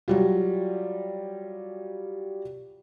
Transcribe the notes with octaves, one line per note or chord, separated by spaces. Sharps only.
F#3 G3 F4